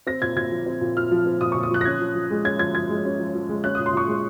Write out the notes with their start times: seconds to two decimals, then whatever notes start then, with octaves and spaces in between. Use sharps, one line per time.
0.07 C4 A#6
0.22 A#2 G#6
0.36 A#2 G#6
0.51 F3
0.66 C4
0.81 A#2
0.96 A#2 F6
1.11 F3
1.26 C4
1.41 A#2 D#6
1.52 A#2 C#6
1.63 D#6
1.70 F3 F#6
1.81 A#6
1.85 C#4 G#6
2.00 F3
2.15 F3
2.31 G#3
2.45 C#4 G#6
2.59 F3 G#6
2.75 F3 G#6
2.90 G#3
3.05 C#4
3.19 F3
3.34 F3
3.49 G#3
3.64 C#4 F#6
3.75 A#2 D#6
3.86 C6
3.93 A#2 C#6
4.08 G#3